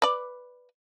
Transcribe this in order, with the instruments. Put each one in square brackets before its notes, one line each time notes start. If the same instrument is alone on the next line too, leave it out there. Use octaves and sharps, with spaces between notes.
[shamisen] B4 D5